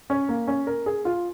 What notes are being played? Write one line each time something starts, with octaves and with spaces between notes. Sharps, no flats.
C#4
A#3
C#4
A#4
G#4
F4